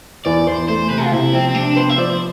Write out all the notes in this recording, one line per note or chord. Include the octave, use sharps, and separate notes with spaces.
E2 D5
E2 C5
A3 C5
C3 B4
F4
C3 E4
F3 C4
C4
C3 D4
B3 C5
E5
F3 D5
C5